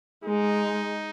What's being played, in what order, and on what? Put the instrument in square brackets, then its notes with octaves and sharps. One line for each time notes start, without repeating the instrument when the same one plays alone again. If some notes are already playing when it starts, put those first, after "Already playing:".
[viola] G#3 [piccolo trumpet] D#4